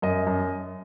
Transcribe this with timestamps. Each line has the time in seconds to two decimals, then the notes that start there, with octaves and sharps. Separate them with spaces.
0.02 F#2 D#5
0.27 F#2